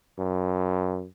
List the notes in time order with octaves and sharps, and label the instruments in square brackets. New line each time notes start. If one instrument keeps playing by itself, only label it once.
[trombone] F#2